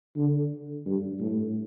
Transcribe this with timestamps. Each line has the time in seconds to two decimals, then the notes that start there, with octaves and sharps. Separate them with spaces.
0.17 D3
0.86 G2
1.20 A2